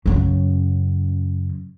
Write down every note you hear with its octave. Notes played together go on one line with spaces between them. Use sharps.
F#2 C#3